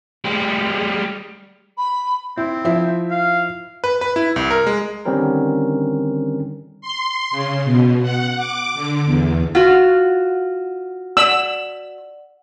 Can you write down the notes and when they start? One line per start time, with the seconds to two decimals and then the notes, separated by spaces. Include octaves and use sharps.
0.25 G3 G#3
1.77 B5
2.37 C4 E4
2.65 F3 E4 E5
3.11 F5
3.84 B4
4.01 B4
4.16 E4
4.36 C2
4.50 A#4
4.67 G#3
5.05 D3 D#3 G3 C4 C#4 A#4
6.81 C6
7.31 C#3
7.65 B2
8.02 F#5
8.37 D6
8.75 D3
9.05 E2
9.55 F4 F#4 F#5
11.17 D5 F#5 E6 F#7